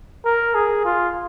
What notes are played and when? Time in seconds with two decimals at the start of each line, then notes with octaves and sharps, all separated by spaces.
0.25 A#4
0.55 G#4
0.85 F4